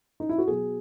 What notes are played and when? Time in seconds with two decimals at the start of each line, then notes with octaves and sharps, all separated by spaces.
0.20 D#4
0.29 E4
0.38 F#4
0.47 B2 F#3 G#4